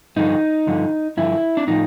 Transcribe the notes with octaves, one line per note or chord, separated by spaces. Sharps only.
G2 D3 F3 D#4
G2 D3 F3
G2 D3 F3 E4
D4
A2 F3 D#4